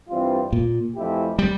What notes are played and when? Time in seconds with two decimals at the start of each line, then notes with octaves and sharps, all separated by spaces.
0.09 G2 E3 G3 C4 F4
0.53 A#2
0.96 F2 E3 A3 E4 G4
1.39 G3